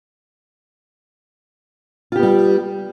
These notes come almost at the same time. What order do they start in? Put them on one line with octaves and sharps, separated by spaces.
F4 G4 B3 G3